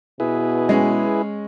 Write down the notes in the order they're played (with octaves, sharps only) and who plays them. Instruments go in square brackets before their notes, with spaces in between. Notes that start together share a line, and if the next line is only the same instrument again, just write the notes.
[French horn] B2 [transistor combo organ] E4 G#4 B4
[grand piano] G#3 C#4